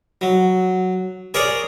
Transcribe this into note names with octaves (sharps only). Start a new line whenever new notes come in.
F#3
G#4 A#4 C#5 D5